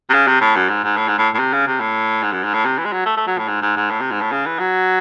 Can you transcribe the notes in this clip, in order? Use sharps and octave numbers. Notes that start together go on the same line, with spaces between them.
C3
C#3
C3
A2
F#2
G#2
G#2
A2
G#2
A2
A2
C3
C#3
C3
A2
G#2
F#2
G#2
A2
C3
E3
G#3
F#3
A3
A3
F#3
A2
G#2
G#2
G#2
A2
C3
G#2
A2
C#3
E3
F#3